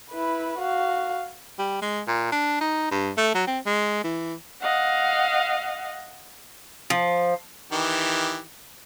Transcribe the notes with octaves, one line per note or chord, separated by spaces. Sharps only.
E4 B4
F#4 F5
G3
G#3
A#2
D4
D#4
G2
A3
F#3
C4
G#3
E3
D#5 F5 F#5
F3
D#3 E3 G4